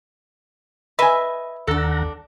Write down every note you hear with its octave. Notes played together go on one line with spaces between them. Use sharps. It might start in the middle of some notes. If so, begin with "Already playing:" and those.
B4 D#5 E5 G#5
D#2 D4 A4 F#5 A#5